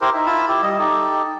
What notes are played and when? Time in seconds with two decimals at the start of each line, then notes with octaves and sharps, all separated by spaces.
0.01 E4 G4 A#4 C5
0.14 D#4 E5
0.26 E4 F4 A5 B5
0.48 E4 G4
0.62 G3 D#5
0.79 D#4 G4 A4